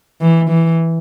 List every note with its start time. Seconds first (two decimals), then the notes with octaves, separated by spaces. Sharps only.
0.21 E3
0.50 E3